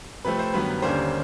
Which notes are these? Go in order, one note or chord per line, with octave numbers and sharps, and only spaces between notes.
C3 F3 A3 C4 B4
C5
G2 D#3 F#3 B3 B4
D#2 D3 G3 A#3 C#4 C5